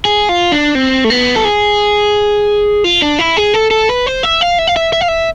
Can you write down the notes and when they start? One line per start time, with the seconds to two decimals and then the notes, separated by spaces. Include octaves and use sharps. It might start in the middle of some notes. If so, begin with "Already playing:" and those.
0.05 G#4
0.29 F4
0.52 D4
0.75 C4
1.04 A3
1.10 B3
1.36 A4
1.45 G#4
2.84 F4
3.02 D4
3.19 E4
3.37 G#4
3.54 A4
3.71 A4
3.89 B4
4.06 C5
4.23 E5
4.41 F5
4.59 E5
4.67 F5
4.76 E5
4.93 E5
5.01 F5
5.08 E5